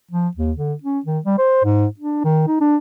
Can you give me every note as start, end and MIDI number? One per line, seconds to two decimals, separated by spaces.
0.11 0.28 53
0.36 0.52 39
0.57 0.73 50
0.83 0.99 61
1.05 1.19 51
1.25 1.36 55
1.38 1.61 72
1.64 1.85 44
2.00 2.23 62
2.24 2.47 51
2.48 2.60 63
2.61 2.76 62